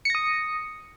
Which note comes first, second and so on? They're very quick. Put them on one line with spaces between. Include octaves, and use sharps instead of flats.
C#7 A#6 D#6